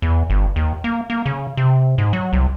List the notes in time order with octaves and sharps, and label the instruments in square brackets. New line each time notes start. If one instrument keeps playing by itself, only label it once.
[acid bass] E2
G1
D#2
A#3
A#3
C#3
C3
G#2
F#3
C2